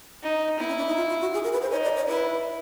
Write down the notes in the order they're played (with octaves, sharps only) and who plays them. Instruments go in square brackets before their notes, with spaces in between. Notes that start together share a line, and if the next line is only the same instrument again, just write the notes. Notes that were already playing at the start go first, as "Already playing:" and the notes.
[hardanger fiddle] D#4
[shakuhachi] B3 [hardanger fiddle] E4
[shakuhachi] C#4
D4
D#4
F4
F4
F#4
G#4
A#4
B4
C5
[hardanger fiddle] D#4 [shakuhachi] C#5
[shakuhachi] D5
C#5
[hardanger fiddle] E4 [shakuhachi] B4